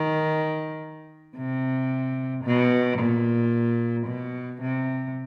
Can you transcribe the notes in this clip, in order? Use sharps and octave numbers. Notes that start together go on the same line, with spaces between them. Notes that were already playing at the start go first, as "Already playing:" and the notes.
Already playing: D#3
C3
B2
A#2
B2
C3